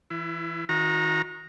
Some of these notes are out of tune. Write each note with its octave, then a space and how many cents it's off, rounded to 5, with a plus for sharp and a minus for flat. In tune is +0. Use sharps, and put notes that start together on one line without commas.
E3 +0 E4 +35
D#3 +20 F#4 -35 A#5 +0